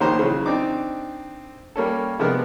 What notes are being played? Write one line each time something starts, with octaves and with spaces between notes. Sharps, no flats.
A#1 D#3 C#4 G4 C5 A#5
C#3 E3 F#3
C4 D4 D#4 D6
G3 A#3 C#4 A4
C3 F3 G#3 B3 D4 A#4